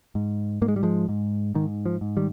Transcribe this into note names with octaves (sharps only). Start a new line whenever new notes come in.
G#2
G#2 A#3
G#3
G3
F3 G#3
G#2
G#2 D#3
F3
G#2
D#3 G3